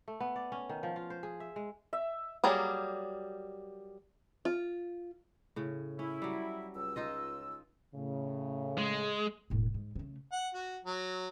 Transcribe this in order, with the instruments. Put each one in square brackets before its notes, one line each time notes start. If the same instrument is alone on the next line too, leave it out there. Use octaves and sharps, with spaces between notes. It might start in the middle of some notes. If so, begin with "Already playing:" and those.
[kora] A3
B3
D5
C#4
D#3
F3
F4
C5
G#4
E5
G#3
[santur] E5
[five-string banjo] F#3 G3 A#3 G#4
F4
[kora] A2 C#3
[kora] C#4 [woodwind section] E4
[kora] F#3 G3
[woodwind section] C#2 E6
[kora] D#4 F4 D#5
[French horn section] A2 C#3
[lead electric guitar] G#3
[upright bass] E1 A2
G#2
C#3 A3
[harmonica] F#5
F#4
F#3